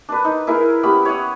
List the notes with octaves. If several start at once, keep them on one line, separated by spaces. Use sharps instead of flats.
D4 B4
D#4
E4 G#4 A#4 B4
B3 C#4 G4 B5
C#5 F#5 D#6